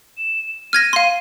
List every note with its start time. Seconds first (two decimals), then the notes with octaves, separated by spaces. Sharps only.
0.18 E7
0.73 F6 G#6 A#6 D#7
0.93 F5 C6